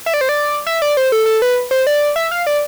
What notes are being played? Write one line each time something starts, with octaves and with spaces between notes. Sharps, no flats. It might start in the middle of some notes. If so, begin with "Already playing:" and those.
E5
D5
C5
D5
E5
D5
C5
A4
A4
B4
C5
D5
E5
F5
D5